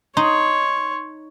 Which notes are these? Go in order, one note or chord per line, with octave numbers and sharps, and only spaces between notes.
D#4 C#5 C6